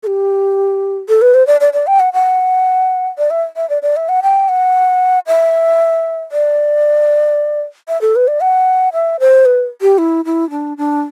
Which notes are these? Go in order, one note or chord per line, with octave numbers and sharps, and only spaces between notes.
A4
G4
A4
B4
C5
D5
D5
D5
G5
F#5
F#5
D5
E5
E5
D5
D5
E5
F#5
G5
F#5
E5
D5
E5
A4
B4
D5
F#5
E5
C5
B4
G4
E4
E4
D4
D4